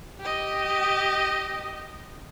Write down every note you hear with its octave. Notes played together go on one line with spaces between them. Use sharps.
G4 D#5